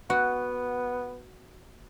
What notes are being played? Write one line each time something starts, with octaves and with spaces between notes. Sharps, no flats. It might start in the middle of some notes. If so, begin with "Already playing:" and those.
B3 F#4